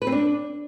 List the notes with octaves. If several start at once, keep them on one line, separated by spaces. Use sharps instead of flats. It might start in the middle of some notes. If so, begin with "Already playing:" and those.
B4
C4
D4